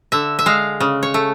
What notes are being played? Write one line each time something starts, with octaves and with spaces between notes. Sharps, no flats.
D3 E5
E5
G#3 F5
C#3
C#5
A3